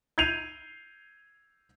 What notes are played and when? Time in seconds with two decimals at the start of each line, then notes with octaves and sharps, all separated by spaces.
0.18 G6 G#6 C7 D#7 F7